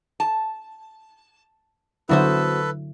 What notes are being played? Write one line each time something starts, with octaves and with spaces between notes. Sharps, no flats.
A5
D3 F#3 B3 E4 F#4 A4 B4 C5